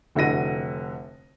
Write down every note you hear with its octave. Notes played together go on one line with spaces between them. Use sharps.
F1 D3 E4 F#4 A#6 D#7